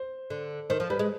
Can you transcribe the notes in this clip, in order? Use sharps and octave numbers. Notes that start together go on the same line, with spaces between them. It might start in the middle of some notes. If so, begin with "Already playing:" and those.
Already playing: C5
D3
D#3 C5
F3
G3 B4
G#3